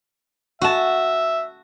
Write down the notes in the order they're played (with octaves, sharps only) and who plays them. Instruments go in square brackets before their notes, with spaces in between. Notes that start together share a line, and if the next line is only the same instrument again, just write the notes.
[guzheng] F#4 A5 [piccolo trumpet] E5